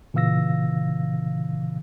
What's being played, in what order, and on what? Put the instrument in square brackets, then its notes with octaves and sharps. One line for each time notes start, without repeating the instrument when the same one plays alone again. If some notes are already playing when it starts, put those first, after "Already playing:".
[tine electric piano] A#2 C#3 E3 F5 E6 A#6